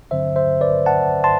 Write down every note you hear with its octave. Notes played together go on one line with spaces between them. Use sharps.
G2 D3 F#3 C4 C5 E5
C5 E5
B4 D5
F#5 A5
A5 C6